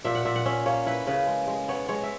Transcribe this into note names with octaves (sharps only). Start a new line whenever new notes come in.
A#2 E5
F#5
A#2 E5
F#5
C#4 E5
A#3 C#5
E4 B4
C#3 B4
G#3
G#3
B3 C#5
G#3 C#5
E5